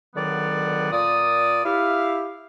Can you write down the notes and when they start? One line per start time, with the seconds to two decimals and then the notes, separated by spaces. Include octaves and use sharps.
0.15 C#2 D3 D#3 F#3 B3 D5
0.92 A#2 D5 D#6
1.65 E4 G4 F5